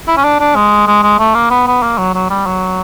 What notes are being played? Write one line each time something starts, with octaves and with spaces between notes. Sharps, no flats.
E4
C#4
D4
D4
G#3
G#3
G#3
A3
A#3
B3
B3
A#3
F#3
F#3
G3
F#3